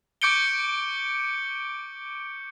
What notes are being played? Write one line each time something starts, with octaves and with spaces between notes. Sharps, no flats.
C#6 D6 G6 C#7 D7 G7